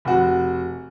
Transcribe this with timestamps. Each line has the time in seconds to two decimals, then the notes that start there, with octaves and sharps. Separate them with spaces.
0.05 F1 F#4